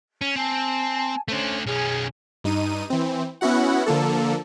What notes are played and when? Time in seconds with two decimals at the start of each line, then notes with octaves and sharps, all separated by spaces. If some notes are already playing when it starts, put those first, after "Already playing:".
0.22 C#4
0.36 C4 G#5 A5
1.28 A3 C#4 D4 C5
1.66 B1 C#4 G#4 G#5
2.44 G2 D#4 D#7
2.90 E3 C4
3.41 B3 C#4 E4 F#4 F#5
3.86 D3 F3 A#3 A4